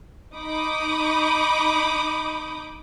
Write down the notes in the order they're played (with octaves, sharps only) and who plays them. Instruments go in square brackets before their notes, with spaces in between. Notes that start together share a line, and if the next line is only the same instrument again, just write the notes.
[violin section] D#4 B5 D6 D#6 G6